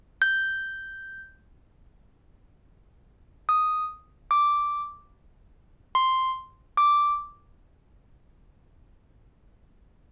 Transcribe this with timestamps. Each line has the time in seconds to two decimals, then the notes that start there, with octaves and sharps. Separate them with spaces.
0.22 G6
3.49 D#6
4.31 D6
5.95 C6
6.77 D6